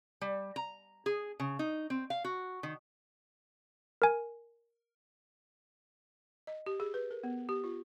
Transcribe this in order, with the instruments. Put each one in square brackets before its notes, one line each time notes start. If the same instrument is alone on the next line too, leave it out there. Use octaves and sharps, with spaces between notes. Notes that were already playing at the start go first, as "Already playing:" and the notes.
[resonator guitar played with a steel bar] G3
A#5
G#4
C#3
D#4
C4
F5
F#4
D#3
[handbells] A#4 G#5
[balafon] D#5
G4
G#4
B4
A#4
B3
G4
F4